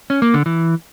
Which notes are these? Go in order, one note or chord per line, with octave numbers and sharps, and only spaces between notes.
C#4
A#3
D3
E3